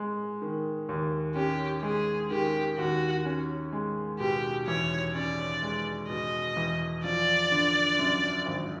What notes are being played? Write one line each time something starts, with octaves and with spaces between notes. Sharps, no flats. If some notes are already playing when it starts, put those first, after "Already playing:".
Already playing: G#3
D#3
D#2
C#4 G4
G#3 G#4
D#3 G4
D#2 F#4
C#4
G#3
B2 G4
E2 C#5
C#4 D5
G#3
B2 D#5
E2
F3 D5
D3
F#2
G#1